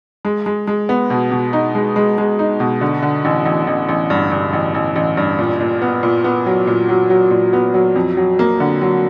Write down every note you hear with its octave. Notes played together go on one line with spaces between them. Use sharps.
G#3
G#3
G#3
B3
B2
B2
D#4
G#3
G#3
G#3
D#4
B2
D3
D3
A1
A1
A1
A1
G2
G2
A1
A1
A1
G2
A#2
A#2
B3
A#2
B3
F#3
A#2
F#3
F#3
A#2
B3
F#3
F2
F#3
A#3
D3
F#3